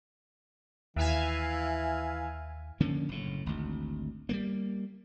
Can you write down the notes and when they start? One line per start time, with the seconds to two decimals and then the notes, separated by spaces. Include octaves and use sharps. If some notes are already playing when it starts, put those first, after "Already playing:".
0.96 D#2 E3 E5 F5 G#5
2.80 D3 F3 A#3 C#4
3.09 F#1 A2
3.46 G#1 D2
4.29 G3 A3 A#3